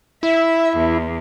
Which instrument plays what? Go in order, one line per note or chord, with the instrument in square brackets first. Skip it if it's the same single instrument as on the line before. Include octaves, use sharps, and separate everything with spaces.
[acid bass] E4 [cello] E5
[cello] E2